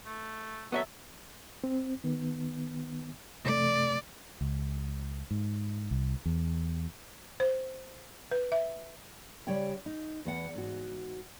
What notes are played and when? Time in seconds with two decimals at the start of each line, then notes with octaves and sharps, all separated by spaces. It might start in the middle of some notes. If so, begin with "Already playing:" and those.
0.06 A3
0.72 F#3 B3 A4 D#5 E5
1.64 C4
2.04 D#3 B3
3.46 C3 A3 D5
4.41 C#2
5.31 G#2
5.91 C2
6.26 E2
7.40 C5
8.31 B4
8.52 E5
9.47 C#3 G3 G4 C#5 D5 G5
9.86 D#4
10.25 E2 B3 F#5
10.55 G#2 F#4